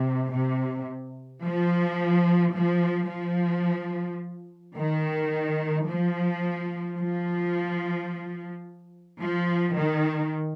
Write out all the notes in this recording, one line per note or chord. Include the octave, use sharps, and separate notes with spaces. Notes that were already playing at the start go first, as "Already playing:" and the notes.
Already playing: C3
C3
F3
F3
F3
D#3
F3
F3
F3
D#3